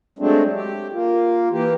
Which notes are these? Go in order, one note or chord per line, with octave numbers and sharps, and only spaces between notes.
F#3 G#3 A3 C4 D4
G4
A#3 F4
E3 A#3 G4